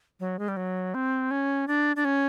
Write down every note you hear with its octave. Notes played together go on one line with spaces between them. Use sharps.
F#3
G#3
G3
F#3
C4
C#4
D4
D4
C#4